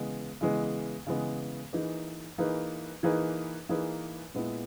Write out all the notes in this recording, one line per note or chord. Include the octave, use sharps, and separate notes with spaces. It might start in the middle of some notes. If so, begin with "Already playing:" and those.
Already playing: C#3 E3 G#3 B3
C#3 E3 G#3 B3
C#3 E3 G#3 B3
E3 A#3 D#4 G#4 B4
E3 A#3 D#4 G#4 B4
E3 A#3 D#4 G#4 B4
E3 A#3 D#4 G#4 B4
A#2 G#3 B3 E4